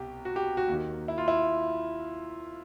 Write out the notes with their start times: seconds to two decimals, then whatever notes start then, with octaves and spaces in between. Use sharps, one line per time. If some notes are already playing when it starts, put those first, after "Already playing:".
Already playing: C2 B2 G4
0.25 F#4
0.36 G4
0.57 F#4
0.68 D#2 D#3
1.08 E4
1.18 F4
1.28 E4